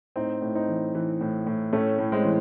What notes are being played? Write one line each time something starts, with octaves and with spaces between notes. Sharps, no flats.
A2 C4 D#4
A2
C4 D#4
E3
E3
A2
A2
A2 A3 C#4
A2
G#3 C4
E3